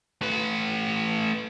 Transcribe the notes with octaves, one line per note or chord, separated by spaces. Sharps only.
A3 B4